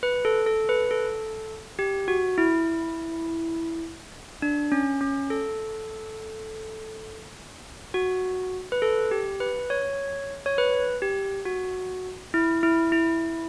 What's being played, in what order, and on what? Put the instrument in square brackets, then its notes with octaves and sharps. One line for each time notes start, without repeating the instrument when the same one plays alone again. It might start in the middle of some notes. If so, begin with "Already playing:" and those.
[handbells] B4
A4
A4
B4
A4
G4
F#4
E4
D4
C#4
C#4
A4
F#4
B4
A4
G4
B4
C#5
C#5
B4
G4
F#4
E4
E4
E4